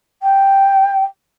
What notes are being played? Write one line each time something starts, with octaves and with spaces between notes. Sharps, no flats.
G5